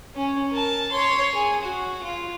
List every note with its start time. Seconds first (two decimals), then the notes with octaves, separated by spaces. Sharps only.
0.16 C#4
0.51 A#4 A5
0.92 C#5 C6
1.33 G#4
1.63 F#4
2.03 F4